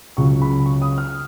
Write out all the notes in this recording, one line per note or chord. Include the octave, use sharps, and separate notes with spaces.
C#2 C#3 F#3 C#6
B5
C#6
D#6
F6